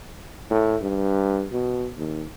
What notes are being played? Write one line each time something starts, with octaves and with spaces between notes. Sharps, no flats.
A2
G2
B2
D#2